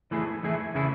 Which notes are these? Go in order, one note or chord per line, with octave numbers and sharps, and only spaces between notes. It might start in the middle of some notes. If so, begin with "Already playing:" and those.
E3 A3 E4 G#4
E3 A3 E4 G#4
C#3 E3 A3 E4 G#4